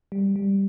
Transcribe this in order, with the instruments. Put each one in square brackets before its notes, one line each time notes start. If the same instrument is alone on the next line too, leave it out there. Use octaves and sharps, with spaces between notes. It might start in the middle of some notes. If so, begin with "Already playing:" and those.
[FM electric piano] G3
G3